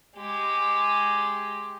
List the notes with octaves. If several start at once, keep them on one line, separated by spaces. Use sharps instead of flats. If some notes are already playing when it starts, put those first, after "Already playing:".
G#3 G4